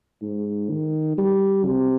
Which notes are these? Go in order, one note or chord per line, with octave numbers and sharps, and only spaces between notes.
G#2
D#3
G3
C3